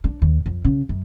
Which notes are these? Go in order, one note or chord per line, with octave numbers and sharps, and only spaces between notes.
D4
D#2
F2
C#3
F#2